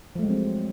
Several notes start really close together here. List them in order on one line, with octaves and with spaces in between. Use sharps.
F3 A3 G#3 F#3 C4